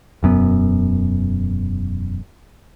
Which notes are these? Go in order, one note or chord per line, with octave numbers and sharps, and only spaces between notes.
E1 F#2 B3